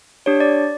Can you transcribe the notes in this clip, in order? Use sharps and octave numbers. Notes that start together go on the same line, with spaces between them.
D4 G4 C#5
D5